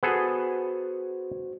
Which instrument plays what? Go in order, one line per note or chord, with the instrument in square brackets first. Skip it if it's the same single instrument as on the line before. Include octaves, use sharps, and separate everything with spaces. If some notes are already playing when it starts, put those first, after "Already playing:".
[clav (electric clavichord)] B3 G#4 A4 [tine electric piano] F#4 C5